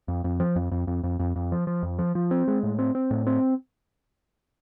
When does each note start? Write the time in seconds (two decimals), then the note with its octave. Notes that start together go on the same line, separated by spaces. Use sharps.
0.08 F2
0.24 F2
0.40 F3
0.56 F2
0.72 F2
0.87 F2
1.04 F2
1.19 F2
1.36 F2
1.52 F3
1.67 F3
1.83 F2
1.99 F3
2.15 F3
2.31 C4
2.48 G#3
2.63 A2
2.79 C4
2.95 C4
3.11 A2
3.27 C4